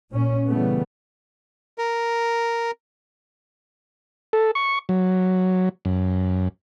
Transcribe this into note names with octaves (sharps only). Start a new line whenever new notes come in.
A#2 C#4
C#3 E3 G3 A3 B3
A#4
A4
C#6
F#3
F#2